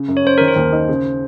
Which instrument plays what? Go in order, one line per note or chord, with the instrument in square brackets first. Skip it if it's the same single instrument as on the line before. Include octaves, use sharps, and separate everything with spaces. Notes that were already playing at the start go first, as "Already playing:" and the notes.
Already playing: [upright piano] C#3
F#2
[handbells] C#5
[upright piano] F#2 [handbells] C5
[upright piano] D#3 [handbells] A#4
[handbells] C5
[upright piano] D#2
D#4
C#3